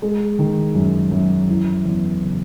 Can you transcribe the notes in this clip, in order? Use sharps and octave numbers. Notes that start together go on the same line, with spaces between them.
G#3
D#3
F#2
F#2
E3
E2
C#3